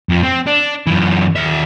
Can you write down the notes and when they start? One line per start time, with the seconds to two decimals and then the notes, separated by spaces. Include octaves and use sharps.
0.09 F2
0.23 C4
0.47 D4
0.87 F#2 E3
1.36 D#2 E5